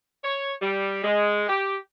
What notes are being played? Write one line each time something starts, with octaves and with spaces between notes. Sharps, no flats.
C#5
G3
G#3
G4